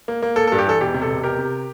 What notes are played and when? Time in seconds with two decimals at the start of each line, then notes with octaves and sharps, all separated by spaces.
0.08 A#3
0.22 A#3
0.36 A#3 A4
0.47 A4
0.52 G2
0.58 G4
0.66 E3 A4
0.81 E1 G4
0.94 C3
1.02 A4
1.10 E1
1.23 C3 G4 A#4
1.39 C3